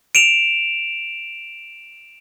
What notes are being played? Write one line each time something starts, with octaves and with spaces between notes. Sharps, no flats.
D7 E7 F7